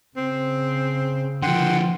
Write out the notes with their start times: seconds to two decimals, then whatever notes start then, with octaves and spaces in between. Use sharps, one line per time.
0.17 C#3 C4
1.43 D3 F3 F#5 G5 C6